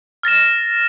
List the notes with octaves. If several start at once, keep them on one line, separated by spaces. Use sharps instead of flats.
F6 A6 A#6 E7